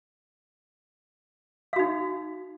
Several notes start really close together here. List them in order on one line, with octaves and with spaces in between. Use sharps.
F5 F#4 D#4